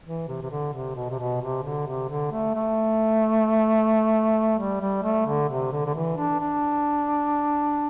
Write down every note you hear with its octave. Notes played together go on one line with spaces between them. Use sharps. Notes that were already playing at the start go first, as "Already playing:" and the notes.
E3
C3
C3
D3
C3
B2
C3
B2
C3
D3
C3
D3
A3
A3
G3
G3
A3
D3
C3
D3
D3
E3
D4
D4